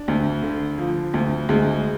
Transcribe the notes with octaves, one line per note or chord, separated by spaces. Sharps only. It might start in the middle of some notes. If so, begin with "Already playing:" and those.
Already playing: D4
D2
D3
F3
D2
D2 G#3